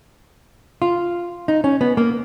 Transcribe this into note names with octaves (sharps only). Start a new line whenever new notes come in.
F4
D#4
C#4
B3
A#3